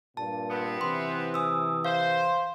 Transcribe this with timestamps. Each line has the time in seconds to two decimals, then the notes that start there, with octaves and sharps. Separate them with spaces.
0.17 G2 A#2 A5
0.49 B3 C4
0.81 C3 E3 C6
1.34 G#5 D#6 E6
1.85 C5 F5